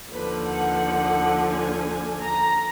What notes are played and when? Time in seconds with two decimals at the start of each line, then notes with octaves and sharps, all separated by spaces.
0.11 D#2 D3 F3 B4
0.46 F#5
1.51 G#5
2.21 A#5